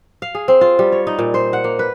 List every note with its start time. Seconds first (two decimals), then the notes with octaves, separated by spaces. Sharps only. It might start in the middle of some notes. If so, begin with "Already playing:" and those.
0.22 F5
0.35 G#4
0.48 C4
0.61 F4
0.79 G3
0.92 C#5
1.07 D#4
1.19 A#2
1.34 C5
1.53 F#5
1.64 A#3
1.79 B4